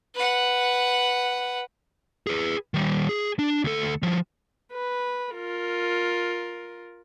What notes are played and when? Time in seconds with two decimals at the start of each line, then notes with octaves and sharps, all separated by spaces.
0.14 B4 F#5
2.27 G#4 B4
2.74 D#3 G3
3.09 G#4
3.39 D4
3.64 D2 A4
4.03 F3 G3
4.73 B4
5.34 F4 A#4